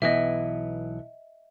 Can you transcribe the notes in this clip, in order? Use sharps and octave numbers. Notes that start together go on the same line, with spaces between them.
B1 E3 B3 D#5 E5